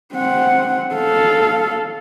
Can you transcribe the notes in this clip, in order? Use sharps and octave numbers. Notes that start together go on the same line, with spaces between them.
C4 F#5
A4 F5